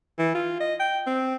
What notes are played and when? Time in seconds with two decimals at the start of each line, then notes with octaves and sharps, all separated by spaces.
0.18 E3
0.35 F4
0.60 D#5
0.80 G5
1.07 C4